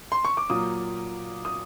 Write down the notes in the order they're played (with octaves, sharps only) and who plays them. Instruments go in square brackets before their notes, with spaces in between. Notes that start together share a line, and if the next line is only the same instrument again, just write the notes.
[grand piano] C6
C#6
D6
A#2 F#3 A#3 D#6
D#6